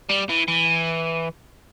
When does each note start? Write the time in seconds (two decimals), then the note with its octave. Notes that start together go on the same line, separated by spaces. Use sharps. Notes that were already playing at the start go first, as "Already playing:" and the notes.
0.10 G3
0.29 E3
0.48 E3